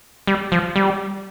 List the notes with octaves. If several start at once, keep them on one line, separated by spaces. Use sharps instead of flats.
G3
F3
G3